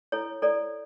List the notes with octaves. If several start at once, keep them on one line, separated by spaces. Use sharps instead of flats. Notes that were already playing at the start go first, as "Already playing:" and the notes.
E4 A4 C#5
E4 A4 C#5 D5